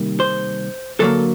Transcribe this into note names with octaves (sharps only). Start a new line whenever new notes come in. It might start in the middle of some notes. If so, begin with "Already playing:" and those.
Already playing: C3 D#3 G3 A#3
C5
D3 F#3 A#3 A4